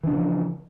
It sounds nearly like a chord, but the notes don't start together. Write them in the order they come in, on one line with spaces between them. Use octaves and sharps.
E3 D4 C#3 F3